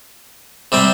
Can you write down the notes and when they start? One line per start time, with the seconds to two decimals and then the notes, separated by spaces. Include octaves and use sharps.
0.72 C3 G3 C4